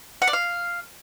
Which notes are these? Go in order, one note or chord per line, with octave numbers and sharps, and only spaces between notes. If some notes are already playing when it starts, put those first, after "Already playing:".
F#5
D5
F5